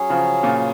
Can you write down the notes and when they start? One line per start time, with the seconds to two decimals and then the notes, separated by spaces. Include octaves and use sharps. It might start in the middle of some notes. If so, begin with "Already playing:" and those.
Already playing: F#3 C#4 G#4
0.10 C#3 F3
0.43 A#2 C#3